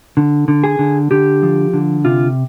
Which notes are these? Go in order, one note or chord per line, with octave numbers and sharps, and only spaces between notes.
D3
D3
G#4
D3
D3 G4
F3
D3
C3 F4